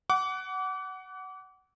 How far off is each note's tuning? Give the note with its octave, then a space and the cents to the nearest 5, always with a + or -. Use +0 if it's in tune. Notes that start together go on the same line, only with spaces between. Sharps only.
F#5 +15 D6 -30